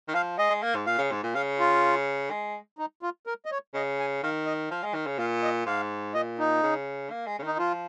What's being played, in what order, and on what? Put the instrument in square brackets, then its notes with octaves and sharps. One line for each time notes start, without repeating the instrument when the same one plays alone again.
[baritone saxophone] D#3
[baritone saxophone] F3 [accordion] F5
[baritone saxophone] G#3 [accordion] D#5
[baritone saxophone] G#3
A#3
G#2
[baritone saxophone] A#2 [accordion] F5
[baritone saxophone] C#3
G#2
A#2
[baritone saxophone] C#3 [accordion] F5
[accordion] F4
[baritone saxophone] G#3
[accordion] D#4
F4
A#4
D#5
C#5
[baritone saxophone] C#3 [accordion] D#5
[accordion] G#5
[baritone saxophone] D#3 [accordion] F5
[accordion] D#5
[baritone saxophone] F3 [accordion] F5
[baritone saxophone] G#3
D#3
C#3
[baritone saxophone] A#2 [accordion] F5
[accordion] D#5
[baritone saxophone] G#2 [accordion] F5
[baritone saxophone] A#2 [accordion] D#5
[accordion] D#4
[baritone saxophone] C#3
A#3
G#3
C#3
[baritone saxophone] D#3 [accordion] D#4
[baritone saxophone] F3 [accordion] F4